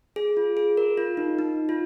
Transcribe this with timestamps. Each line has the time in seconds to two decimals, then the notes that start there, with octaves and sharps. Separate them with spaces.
0.16 G#4
0.37 F4
0.57 G#4
0.77 A#4
0.98 F4
1.17 D#4
1.39 D#4
1.69 F4